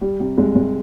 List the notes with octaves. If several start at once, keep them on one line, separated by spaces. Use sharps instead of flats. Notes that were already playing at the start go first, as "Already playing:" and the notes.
G3
C3 G3
C2 G#3
C2